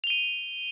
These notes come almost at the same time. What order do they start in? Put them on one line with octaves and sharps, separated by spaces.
F7 G7 D#7